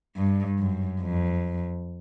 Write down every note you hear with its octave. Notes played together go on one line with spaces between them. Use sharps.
G2
F#2
F2